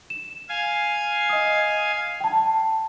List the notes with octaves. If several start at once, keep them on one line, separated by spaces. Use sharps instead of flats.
E7
F5 G#5
D#5 D#6
G5 A5